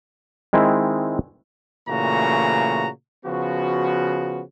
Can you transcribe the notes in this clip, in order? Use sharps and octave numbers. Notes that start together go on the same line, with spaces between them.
D#3 G#3 C4 E4
A#2 C#3 E3 A3 F#4 A#5
C#3 F3 B3 F#4